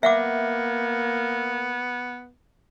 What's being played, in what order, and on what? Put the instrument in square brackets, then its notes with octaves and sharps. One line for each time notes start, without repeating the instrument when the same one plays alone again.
[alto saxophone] A#3 [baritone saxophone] B3 [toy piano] E5 F#5 D6